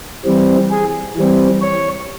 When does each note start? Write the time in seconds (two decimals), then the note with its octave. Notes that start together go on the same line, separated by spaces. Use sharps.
0.25 E3 G3 C4
0.71 G#4
1.16 E3 G3 C4
1.61 C#5